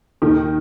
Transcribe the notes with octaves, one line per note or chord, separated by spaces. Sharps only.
D#2 D#3